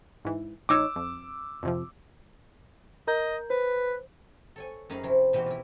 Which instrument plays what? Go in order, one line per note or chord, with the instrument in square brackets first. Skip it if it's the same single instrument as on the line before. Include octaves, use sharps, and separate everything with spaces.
[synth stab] G#2 E3
[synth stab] A#1 D#4 C#5 [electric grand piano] D6 E6
[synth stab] F2
F2 C3 F3
[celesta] A#4 A#5 G6 [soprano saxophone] D#5
[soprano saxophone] B4 [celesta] C5
[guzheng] A4 C#5 G#5
F#2 C#4 D#4 G#4 F5 B5
C3 F3 E4
B2 E3 C4 F#4 G4
E4 F4